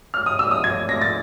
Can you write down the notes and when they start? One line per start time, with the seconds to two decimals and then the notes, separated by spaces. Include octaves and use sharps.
0.14 F6
0.26 D#6
0.39 E6
0.51 D#6
0.64 G#6
0.89 A#6
1.01 A6